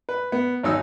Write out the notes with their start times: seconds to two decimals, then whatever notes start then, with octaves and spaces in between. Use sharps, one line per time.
0.09 B4
0.32 B3
0.63 G#1 F#3 D#4 E6